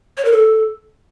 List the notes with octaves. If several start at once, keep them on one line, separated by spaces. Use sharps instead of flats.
C#5
A#4
A4